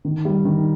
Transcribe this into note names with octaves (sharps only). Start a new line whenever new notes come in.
D#3
G3
D#3